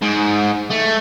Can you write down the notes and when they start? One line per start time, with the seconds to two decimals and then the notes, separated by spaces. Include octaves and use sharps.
0.02 G#2
0.70 A3